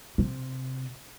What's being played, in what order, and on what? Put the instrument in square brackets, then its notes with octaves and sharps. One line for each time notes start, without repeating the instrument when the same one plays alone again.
[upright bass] C3